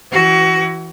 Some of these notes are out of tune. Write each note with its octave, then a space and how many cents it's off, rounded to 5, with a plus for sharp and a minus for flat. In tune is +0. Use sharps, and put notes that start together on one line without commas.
E3 +0 F#4 +25